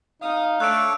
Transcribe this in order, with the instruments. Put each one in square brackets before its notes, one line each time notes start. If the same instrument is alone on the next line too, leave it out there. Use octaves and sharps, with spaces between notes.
[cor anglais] D#4 [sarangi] F5 [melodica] D#6
[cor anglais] A3 [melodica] D4 A4 C#5 [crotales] F#6 D7